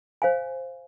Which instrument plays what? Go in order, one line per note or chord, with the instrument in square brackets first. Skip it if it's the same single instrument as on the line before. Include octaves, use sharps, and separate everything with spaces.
[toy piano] C5 F5 G#5